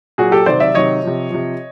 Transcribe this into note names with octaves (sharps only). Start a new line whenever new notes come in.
A#2 F#3 F#4 G#4
G4 A4
C3 D#3 F#3 C5 D5
D5 E5
C3 D#3 F#3 C#5 D#5
C3 F3
C3 F3